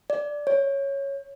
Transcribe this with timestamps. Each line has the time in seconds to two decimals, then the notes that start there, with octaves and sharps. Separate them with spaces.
0.10 D5
0.47 C#5